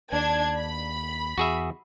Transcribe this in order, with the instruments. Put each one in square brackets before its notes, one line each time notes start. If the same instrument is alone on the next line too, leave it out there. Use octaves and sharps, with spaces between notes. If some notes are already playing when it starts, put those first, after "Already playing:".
[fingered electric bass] D#2 [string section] D4 G#6
[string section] B5
[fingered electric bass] E2 [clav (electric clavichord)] F#4 G#4 E5